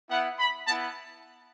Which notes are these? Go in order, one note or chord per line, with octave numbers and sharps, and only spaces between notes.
B3 E4 F#5
B5
B3 E4 A5